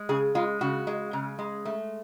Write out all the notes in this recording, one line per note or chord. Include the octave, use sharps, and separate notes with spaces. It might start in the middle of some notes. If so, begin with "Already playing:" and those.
Already playing: G#3
C#3 G#4
G#3 F4
C#3 F#4
G#3
C#3
G#3
A3